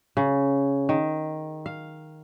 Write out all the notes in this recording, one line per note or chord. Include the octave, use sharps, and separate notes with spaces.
C#3
D#3
F5